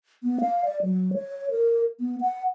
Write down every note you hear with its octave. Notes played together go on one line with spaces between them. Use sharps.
B3
F5
D5
F#3
C#5
A#4
B3
F#5